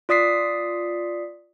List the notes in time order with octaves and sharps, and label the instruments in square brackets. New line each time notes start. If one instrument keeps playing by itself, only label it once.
[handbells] F4 D5 D#6 B6 C7